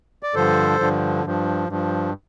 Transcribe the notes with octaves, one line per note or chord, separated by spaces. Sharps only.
D5
G2 D3 F3 A4 C5
G2 D3 F3
G2 F3
G2 F3